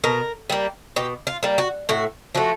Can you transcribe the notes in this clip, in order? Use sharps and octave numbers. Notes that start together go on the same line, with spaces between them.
B2 A#4
G3 A#3
B2 G4
F4
G3 A#3
F#4
A2 F#4
F3 A3 F#4